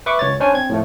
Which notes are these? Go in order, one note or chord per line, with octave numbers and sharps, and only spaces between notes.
B4 E5 C#6 D6
C#2 C#5 A6
C#4 D4 C5 C#5 G#5
C4 G#6
A2 F3 A3